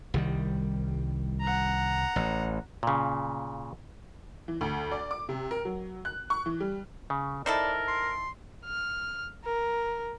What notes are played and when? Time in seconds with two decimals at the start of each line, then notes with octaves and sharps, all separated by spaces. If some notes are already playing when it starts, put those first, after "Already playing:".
0.14 C2 D#3 G3
1.41 F#5 A#5
2.16 A1
2.83 A#2 C#3
4.48 E3
4.61 D2
4.92 D5
5.11 D6
5.29 C3
5.51 A#4
5.65 F#3
6.05 F#6
6.30 C#6
6.46 E3
6.60 G3
7.10 C#3
7.46 D#4 E4 A4 A#4 C5 D5
7.88 C6
8.65 F6
9.44 A#4